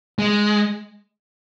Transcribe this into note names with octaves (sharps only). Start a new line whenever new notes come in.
G#3